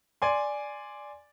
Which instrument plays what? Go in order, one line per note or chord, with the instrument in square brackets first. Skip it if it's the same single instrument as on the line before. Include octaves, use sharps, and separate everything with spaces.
[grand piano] D5 G#5 C6